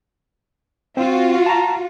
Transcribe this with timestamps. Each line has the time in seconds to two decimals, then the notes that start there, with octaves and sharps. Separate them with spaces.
0.97 C4 F4 F#4
1.46 A5 A#5